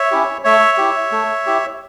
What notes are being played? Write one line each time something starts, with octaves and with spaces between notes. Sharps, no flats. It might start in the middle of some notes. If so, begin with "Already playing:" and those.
Already playing: C#5 E5
C#4 E4 G4
A3 C#5 E5
E4 G4
A3
E4 G4